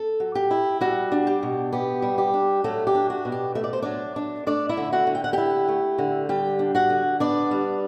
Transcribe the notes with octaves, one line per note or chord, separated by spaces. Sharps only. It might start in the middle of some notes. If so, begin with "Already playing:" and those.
Already playing: A4
F#3
G4
E4
G3 F#4
D4
G4
B2
B3 G4
G3
G4
D4
F#3 A3 A4
G4
D4
F#4
B2
G4
A3 E5
D5
C5
F#3 D4 D5
D4
A3 D4 D5
E4 E5
D3
F#4 F#5
D3
G5
F#5
E4 G4 G5
A3
D3
G3 G4 G5
D4
F#4 F#5
D3
B3 D4 D5
G3